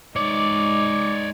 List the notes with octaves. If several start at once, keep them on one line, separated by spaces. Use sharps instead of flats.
G#3 D#4 C#5 D5 D6